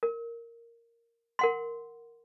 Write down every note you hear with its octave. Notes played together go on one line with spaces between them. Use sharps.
A#4
A#4 F#5 C6